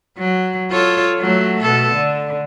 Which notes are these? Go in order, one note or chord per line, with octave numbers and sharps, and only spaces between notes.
F#3
F4 A4 C#5
F#3 A3
B2 A4
D3